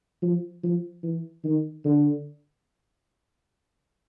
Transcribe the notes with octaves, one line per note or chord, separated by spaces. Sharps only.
F3
F3
E3
D#3
D3